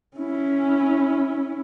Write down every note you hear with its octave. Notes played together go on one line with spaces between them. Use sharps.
C#4 E4